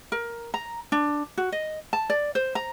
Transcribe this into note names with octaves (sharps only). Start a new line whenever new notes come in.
A#4
A#5
D4
F#4
D#5
A5
D5
C5
A#5